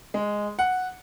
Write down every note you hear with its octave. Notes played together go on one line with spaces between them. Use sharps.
G#3
F#5